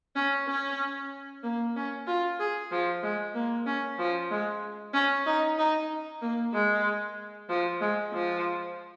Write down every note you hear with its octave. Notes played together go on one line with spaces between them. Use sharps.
C#4
C#4
A#3
C#4
F4
G#4
F3
G#3
A#3
C#4
F3
G#3
C#4
D#4
D#4
A#3
G#3
F3
G#3
F3